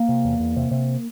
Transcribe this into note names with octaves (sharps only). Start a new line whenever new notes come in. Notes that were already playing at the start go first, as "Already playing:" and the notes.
Already playing: A#3
C3
E2
E2
C3
C3